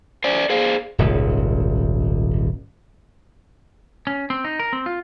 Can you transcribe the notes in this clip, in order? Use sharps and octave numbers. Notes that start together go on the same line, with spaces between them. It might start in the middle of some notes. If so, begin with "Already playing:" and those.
C5 D5 G#5
G#4 C5 F5
D#1 G#1 C#2
C#4
C4
D#4
A#4
C4
F4